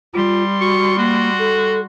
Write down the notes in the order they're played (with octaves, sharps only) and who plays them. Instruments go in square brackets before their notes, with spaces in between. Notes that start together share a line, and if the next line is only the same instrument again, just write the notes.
[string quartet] G3 C6 [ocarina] F4
[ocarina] F#4 [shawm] C#6
[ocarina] A#3 [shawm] F#4
[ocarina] A4